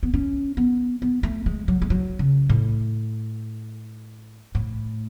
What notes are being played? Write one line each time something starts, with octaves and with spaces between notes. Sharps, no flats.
B3
C#4
B3
B3
A3
G#3
F#3
G#3
F#3
C#3
A2
A2